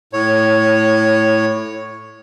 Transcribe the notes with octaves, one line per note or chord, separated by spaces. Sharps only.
A2 C#5